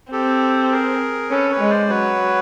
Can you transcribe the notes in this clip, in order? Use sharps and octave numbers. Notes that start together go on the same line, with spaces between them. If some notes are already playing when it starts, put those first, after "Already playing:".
C4 G4 A4
G#4 A#4
C#4 A4 B4
B4 C#5
G#3
C5 D5
F#3 B4 C#5